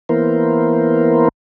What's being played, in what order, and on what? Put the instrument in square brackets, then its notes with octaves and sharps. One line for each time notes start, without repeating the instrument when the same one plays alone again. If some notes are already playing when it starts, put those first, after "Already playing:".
[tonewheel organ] E3 A#3 B3 E4 A#4 C5